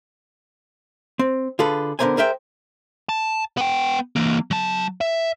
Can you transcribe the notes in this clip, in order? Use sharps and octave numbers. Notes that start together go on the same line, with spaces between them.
C4
D3 F4 G#4 A4 B4
D3 B3 D4 A#4 C5 G#5
G#4 A#4 C5 E5 G5
A5
B3 G5
E3 A#3
F#3 A5
E5